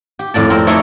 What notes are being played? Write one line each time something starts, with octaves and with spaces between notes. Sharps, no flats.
G4
F2 A2 D5 A5
C4 A#4
A3 D#4 C#5 D5 E5 C6